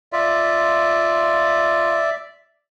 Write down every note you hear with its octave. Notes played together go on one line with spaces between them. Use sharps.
F4 D5 E5